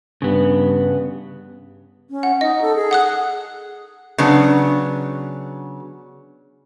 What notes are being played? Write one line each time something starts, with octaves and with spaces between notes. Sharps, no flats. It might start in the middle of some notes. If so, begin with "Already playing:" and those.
G2 C#3 B3
C#4
F#5
D#4 D#5
A4
G#4
F#5 D#6 F#6
C#3 F#3 B3 D4